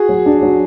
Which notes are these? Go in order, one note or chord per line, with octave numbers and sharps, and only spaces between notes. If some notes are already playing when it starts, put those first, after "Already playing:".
Already playing: F#4 G#4
F#3
D4
F#3